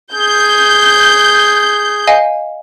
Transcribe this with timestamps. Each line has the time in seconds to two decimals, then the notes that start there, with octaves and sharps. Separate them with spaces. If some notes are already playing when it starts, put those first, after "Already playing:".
0.13 G#4 G6
2.07 D#5 F5 G#5